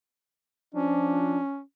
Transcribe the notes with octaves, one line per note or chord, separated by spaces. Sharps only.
F3 C#4 D4